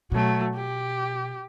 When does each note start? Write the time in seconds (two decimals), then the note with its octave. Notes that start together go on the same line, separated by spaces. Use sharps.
0.12 B2 F#3 A3
0.55 G4